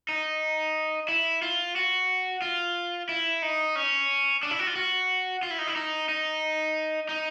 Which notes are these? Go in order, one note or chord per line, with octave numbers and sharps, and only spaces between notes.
D#4
E4
F4
F#4
F4
E4
D#4
C#4
D4
E4
F#4
F4
F#4
F4
E4
D#4
E4
D#4
D#4
D#4